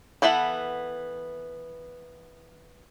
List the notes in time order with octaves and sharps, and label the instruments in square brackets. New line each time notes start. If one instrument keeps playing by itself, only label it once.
[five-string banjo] E3 B3 A4 E5 F#5